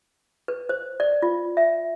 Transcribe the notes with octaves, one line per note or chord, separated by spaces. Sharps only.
B4
C5
D5
F4
E5